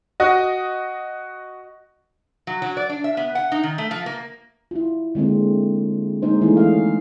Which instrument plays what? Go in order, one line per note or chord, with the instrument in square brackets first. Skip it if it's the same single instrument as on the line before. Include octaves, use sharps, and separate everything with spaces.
[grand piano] F#4 D#5
[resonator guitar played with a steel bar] F#3
F#3
D5
D4
E5
B3
F#5
D#4
D#3
A3
F3
A#3
[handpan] E4 F4
D3 G#3 A#3 C4
G#3 A#3 C#4 D#4 C5
E3 A3 B3 C#4 D#4 E4
C#4 F5